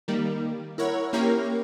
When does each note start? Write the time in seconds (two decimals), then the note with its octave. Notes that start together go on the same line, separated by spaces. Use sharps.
0.08 D#3 G3 A#3
0.78 E4 A#4 C#5 F#5
1.13 A#3 C#4 E4 G4 A#4 C#5